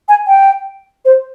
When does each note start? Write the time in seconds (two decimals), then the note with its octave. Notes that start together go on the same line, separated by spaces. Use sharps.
0.09 G#5
0.27 G5
1.05 C5